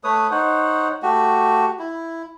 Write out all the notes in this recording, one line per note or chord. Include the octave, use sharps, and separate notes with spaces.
A3 B4 C#5 D#6
D#4 C5 C#5 F#5
A3 F#4 G4
E4